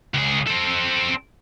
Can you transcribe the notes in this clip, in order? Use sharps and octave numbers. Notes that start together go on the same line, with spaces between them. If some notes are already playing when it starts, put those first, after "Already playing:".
C#2 G#4
C4 A4